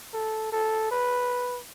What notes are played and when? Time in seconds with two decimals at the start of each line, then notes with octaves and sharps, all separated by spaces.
0.13 A4
0.52 A4
0.91 B4